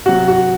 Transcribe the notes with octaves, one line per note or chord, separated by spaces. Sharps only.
C3 F#3 F#4
F#4